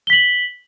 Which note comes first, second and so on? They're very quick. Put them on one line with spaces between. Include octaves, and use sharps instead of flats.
G7 B6 F#7